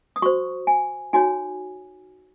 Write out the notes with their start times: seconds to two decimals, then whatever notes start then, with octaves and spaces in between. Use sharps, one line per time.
0.16 D#6
0.22 F#4 C5 C#6
0.67 G#5
1.13 D#4 F#4 C#5 G#5